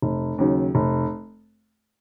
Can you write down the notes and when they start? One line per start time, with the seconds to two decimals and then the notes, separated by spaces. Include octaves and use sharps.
0.02 F1
0.38 D#2 C#3 F#3
0.75 F1